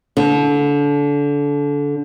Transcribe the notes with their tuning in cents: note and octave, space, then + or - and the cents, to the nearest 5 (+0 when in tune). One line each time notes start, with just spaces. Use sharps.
D3 -25